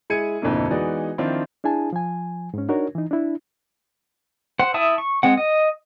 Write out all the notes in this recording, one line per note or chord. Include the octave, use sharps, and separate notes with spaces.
G#3 E4 G#4 G#6 C#7 D#7
G#1 F2 B2 D3 A#3 E4
E3 G#3 B3 D#4 F#4 D5
D#3 F3 C4 D4 E4 F4
D4 E4 G#4 G#5 A5
F3 G#5
G#2 C#4
D4 D#4 F#4 A#4 C#5
E3 D#4
D4 E4
C5 F#5
E4 E5 A5 D#6
C#6
G#3 C4 F#5
D#5